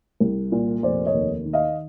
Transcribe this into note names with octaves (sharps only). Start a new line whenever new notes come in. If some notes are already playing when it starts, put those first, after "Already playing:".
C2
A#2
F1 C5 D5
C#5 D#5
D#2
D#3
D#5 F5